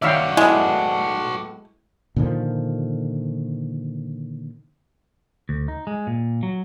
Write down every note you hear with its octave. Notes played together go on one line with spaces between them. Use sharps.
G2 D#3 F#4 C#5 D5 E5 F5 G5
A2 F#3 G#3 B3 E4
A#2 D3 D#3 F3
D2
D#4
G#3
A#2
F#3